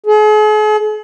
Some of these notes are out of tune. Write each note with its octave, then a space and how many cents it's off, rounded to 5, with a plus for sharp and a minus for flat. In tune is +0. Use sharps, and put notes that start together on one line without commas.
G#4 +45